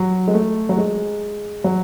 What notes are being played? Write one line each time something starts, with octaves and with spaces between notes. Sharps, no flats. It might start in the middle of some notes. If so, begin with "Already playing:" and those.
Already playing: F#3
G#3
A3
F#3
G#3
F#3